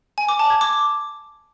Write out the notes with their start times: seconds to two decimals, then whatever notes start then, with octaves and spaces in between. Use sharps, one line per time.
0.18 G#5
0.29 D6
0.39 A5
0.50 G#6
0.61 D6